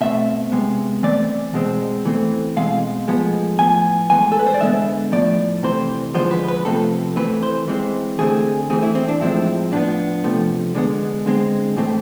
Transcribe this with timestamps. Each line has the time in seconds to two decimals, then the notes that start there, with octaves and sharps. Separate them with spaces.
0.01 B2 A3 C4 E5
0.52 C3 G#3 B3
1.03 E3 A3 C4 D5
1.54 B2 G#3 C4
2.05 E3 A3 C4
2.56 B2 G#3 C4 F5
3.08 A2 F3 G#3 B3
3.59 A2 F3 B3 G#5
4.10 A2 E3 G#3 G#5
4.32 A4
4.39 B4
4.47 C5
4.54 D5
4.61 D3 G#3 B3 E5
5.12 A2 F3 A3 D5
5.63 C3 E3 A3 C4 C5
6.14 D3 F3 G#3 B3 C5
6.31 B4
6.48 B4
6.65 C3 F3 A3 C4 A4
7.16 E3 A3 C4 B4
7.43 C5
7.68 E3 G#3 C4
8.19 D3 A3 C4 G#4
8.70 E3 A3 C4 G#4
8.83 E4
8.95 C4
9.09 D4
9.21 A2 F3 G#3 C4 E4
9.72 A2 F3 B3 D4
10.24 C3 F3 A3
10.75 D3 G#3 B3
11.26 D3 G#3 C4
11.77 A2 E3 A3 C4